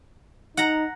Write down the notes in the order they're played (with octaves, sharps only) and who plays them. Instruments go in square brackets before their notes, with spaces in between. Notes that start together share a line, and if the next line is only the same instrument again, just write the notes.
[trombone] D#4 [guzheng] F#5 A#5